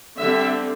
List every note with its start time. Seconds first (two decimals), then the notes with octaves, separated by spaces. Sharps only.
0.19 D3 G3 C4 E5